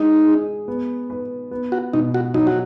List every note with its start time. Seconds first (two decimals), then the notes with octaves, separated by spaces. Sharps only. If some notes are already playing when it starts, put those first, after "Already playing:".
Already playing: G#3 D#4
0.25 G#4
0.68 B3
1.10 B4
1.51 B3
1.72 F#4
1.93 B2 D#4
2.14 F#4
2.34 F#3 D#4
2.47 F#4